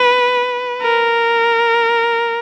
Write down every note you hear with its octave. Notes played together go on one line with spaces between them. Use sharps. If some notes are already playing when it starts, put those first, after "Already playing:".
Already playing: B4
A#4